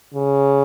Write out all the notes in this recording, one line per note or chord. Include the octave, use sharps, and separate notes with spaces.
C#3